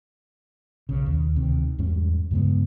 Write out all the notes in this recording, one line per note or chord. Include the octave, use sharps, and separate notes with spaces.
B1 C#3
D#2
D2 C3 D#3
E2 G#2 G3 C#4
G2 C#3 G#3 B3